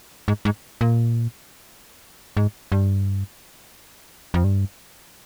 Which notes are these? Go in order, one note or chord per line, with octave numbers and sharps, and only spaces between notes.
G#2
G#2
A#2
G#2
G2
F2
G2